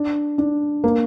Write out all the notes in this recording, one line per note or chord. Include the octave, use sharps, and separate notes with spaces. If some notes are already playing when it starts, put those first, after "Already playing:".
Already playing: D4
D4
A#3